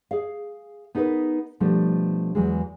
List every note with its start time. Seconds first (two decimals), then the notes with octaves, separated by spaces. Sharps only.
0.11 G#4 F5
0.95 B3 D#4 G#4 A#4 B4
1.60 B2 F3 G3 A3 D4
2.35 E2 E3 F#3 G#3